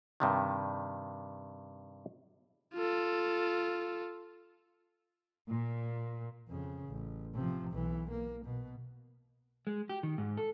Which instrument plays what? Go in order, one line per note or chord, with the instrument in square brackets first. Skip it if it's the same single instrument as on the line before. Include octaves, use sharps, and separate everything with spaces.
[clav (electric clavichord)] G2 C3 D#3
[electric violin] F4 A4
[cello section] A#2
[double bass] F2 C#3
A1
C3 F3
B1 E3
A#3
B2
[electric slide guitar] G#3
G4
D#3
G#2
A4